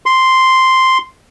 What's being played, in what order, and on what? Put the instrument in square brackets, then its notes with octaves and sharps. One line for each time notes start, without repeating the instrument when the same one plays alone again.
[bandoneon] C6